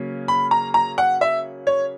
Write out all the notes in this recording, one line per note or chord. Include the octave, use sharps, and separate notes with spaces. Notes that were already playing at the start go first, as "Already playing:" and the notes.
Already playing: C#3 F#3 A#3 C#4
B5
A#5
A#5
F#5
E5
C#5